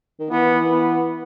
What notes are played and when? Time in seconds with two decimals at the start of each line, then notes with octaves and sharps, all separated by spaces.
0.19 D#3
0.31 E3 B3
0.72 B3